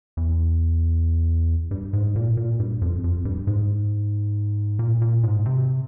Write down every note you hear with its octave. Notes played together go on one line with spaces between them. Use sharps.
E2
G2
G#2
A#2
A#2
G2
F2
F2
G2
G#2
A#2
A#2
G#2
C3